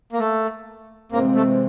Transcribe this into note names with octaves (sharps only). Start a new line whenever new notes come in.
A#3
A3
C3 E3 G#3 A#3 C4
A3